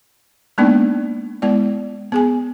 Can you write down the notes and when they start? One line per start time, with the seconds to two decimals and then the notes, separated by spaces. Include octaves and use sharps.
0.58 G#3 A#3 B3 D4 D#4 D5
1.42 G#3 B3 E4 D5
2.12 B3 G#4 G#5